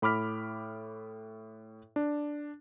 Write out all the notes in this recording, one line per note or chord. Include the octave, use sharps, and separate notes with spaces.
A2 B5 D6 F6 B6
D4